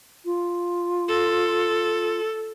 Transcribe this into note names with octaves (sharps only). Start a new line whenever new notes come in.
F4
A4